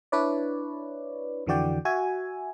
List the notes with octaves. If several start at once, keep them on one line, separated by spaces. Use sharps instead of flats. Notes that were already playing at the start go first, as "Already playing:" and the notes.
D4 E4 B4 C#5 D5
F2 D3 E3 F#4 D5 G5
F#4 E5 G#5